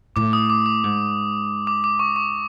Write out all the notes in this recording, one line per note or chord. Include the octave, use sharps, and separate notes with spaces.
A2 D6
D#6
D6
D6
G#2
D6
D6
C#6
C#6